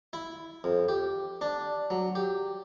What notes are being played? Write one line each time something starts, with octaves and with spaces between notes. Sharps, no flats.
E4
F2
G4
D4
F#3
G4